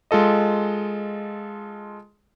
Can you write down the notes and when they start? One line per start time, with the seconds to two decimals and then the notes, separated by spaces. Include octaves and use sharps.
0.11 G#3 F4 A4 D#5